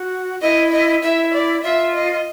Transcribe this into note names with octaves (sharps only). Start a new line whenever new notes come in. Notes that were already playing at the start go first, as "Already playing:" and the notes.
Already playing: F#4
E4 D#5
D#5
E4 E5
D5
F4 E5
D#5